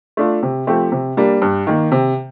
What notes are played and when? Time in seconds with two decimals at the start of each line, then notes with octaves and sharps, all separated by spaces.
0.17 A3 D4 F4
0.43 C3
0.67 F3 A3 C4 G4
0.92 C3
1.17 G3 A#3 D4
1.42 G2
1.67 D#3 A#3
1.92 C3